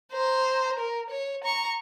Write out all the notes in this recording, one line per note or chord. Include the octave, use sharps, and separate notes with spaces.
C5 A#5
A#4
C#5
A#5 C#6